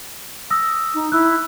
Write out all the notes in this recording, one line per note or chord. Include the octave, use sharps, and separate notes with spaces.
D#6 E6 A#6
D#4
E4 E6 F#6